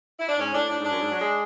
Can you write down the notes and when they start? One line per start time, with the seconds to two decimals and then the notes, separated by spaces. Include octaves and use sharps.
0.20 E4
0.29 D4
0.39 G#2 C#4
0.54 A2 D4
0.70 A2 D4
0.80 G#2
0.85 D4
0.90 F#2
1.00 G#2
1.11 F#3
1.21 G#3